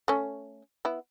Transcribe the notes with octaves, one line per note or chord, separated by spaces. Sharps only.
A3 C#4
B3 E4